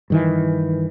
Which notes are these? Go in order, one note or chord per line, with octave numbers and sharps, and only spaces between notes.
G2 D#3 E3